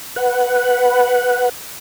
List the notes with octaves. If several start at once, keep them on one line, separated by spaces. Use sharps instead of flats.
B4 F#5